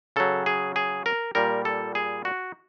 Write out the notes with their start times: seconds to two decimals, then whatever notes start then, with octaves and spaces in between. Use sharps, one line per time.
0.16 C#3 F#3 A4
0.46 G#4
0.76 G#4
1.06 A#4
1.35 A#2 G3 A#4
1.65 A4
1.95 G#4
2.25 F#4